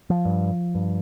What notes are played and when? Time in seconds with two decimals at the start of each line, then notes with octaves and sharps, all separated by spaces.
0.10 F3
0.25 G2
0.75 G2